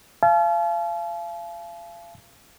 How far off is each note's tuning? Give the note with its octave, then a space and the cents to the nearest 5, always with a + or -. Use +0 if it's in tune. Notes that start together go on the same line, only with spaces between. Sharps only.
F5 -35 A5 -45